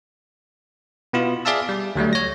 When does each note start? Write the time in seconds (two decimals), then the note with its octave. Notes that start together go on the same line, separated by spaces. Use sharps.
1.13 B2 B3 E4 F4
1.45 G#4 D5 E5 F5 A5 E6
1.69 G3
1.95 D2 F#3 G3 A3
2.13 C#5 A#6